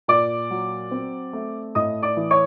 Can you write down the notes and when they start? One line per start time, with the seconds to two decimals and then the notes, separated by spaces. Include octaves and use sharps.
0.08 A#2 D5 D6
0.50 F#3
0.91 C4
1.33 A3
1.75 A2 D#5 D#6
2.03 D5 D6
2.17 E3
2.31 C#5 C#6